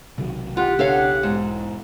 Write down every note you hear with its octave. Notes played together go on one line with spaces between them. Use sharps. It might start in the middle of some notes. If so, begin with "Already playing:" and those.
B1 C3 D#3 F#3
F4 G4 F#5
C#3 D4 A4 C#5 F5
E1 G#2